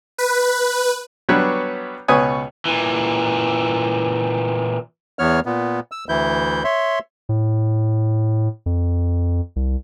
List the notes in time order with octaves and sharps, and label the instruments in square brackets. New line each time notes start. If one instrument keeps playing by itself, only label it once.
[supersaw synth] B4
[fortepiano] F#3 G3 B3 D4 B4 C#5
C#2 B2 B4 C#5 G#5 D#6
[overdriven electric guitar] A#2 E3
[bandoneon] E2 E3 B3 C#5 F6
A#2 B3
E6
D2 E3 E4 G6
C#5 E5 C6
[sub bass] A2
F2
C2